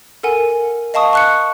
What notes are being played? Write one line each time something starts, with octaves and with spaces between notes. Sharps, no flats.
A4 A#4 F#5 G#5
D#5 F5 A5 C#6 D#6
C#6 F#6 C#7